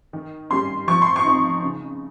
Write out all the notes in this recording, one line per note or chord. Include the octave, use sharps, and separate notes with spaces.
D#3
G3 C#4 C6
F3 C#6
C6
C#6
C4 D#4
C#3